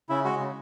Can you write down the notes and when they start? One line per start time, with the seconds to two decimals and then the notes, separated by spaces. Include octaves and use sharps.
0.09 C#3 E4
0.25 G#3 F#4
0.40 C#3